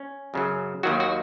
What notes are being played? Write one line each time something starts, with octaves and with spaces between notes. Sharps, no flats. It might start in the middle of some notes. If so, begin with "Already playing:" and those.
Already playing: C#4
F#2 C#3 F#3
D#2 D#3 F#3 F#4
F#4